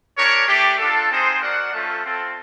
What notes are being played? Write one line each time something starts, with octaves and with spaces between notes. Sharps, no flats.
D4 G4 A#4 C#5
A3 D4 G4
D4 F4 A4
C4 D#4 G#4 C5
F#4 A#4 D5 F#5
A3 C#4 F4 A4 C5
C4 F4 A4